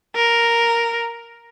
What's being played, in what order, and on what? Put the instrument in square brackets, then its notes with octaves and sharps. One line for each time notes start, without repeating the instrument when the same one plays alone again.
[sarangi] A#4